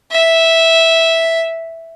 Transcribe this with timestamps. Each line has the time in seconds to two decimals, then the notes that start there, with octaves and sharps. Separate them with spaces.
0.11 E5